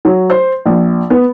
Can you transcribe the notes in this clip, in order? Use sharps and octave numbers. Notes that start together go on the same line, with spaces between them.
F#3
C5
A#1
B3